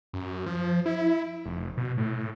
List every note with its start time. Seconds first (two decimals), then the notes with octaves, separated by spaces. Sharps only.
0.13 F#2
0.46 F3
0.86 E4
1.46 F1
1.77 B2
1.97 A2